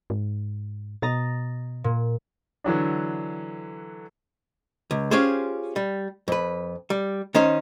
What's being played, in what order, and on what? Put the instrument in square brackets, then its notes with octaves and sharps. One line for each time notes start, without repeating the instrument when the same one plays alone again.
[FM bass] G#2
[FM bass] B2 [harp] D#5 A#5 A6
[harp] A#2
[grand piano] D3 E3 F#3 D4
[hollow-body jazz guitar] C#2
C#4 F4 G4 G#4 C5
G3
F2 B4
G3
D#3 C#4 D#4 C5